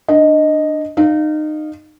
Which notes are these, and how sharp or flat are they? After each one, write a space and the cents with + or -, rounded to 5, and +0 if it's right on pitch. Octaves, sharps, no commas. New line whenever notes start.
D4 +20 D#5 +0
D#4 -25 F5 +0